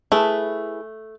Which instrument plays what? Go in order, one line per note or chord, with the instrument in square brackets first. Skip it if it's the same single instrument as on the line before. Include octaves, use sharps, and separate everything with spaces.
[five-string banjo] A3 [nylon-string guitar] E4 G#4 B4